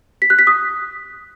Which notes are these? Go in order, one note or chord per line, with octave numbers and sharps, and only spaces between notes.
B6
F#6
B6
D#6